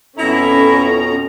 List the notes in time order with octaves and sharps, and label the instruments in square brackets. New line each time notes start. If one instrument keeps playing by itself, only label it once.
[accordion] F2 B2 A#5 [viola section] C#4 A4 [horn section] E4